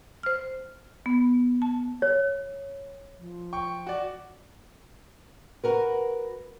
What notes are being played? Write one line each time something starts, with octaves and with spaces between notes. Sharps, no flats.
C5 F6
B3
A5
C#5
F3
G5 C#6
F#4 D5
F#4 A#4 B4